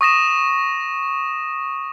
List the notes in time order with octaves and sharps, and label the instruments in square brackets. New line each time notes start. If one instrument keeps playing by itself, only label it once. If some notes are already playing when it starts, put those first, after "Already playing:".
[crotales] C#6 D#6 A#6 E7